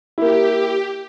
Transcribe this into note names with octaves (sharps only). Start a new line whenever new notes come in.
A#3 E4 G4